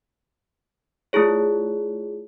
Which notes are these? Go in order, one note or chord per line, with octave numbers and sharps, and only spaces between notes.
A3 E4 F4 G#4 C#5